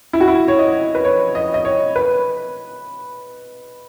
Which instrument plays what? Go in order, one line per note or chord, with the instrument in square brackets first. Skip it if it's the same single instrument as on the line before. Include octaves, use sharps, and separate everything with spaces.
[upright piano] E4
F#4
E4
C#5
D#5
B4
C#5
D#5
D#5
C#5
B4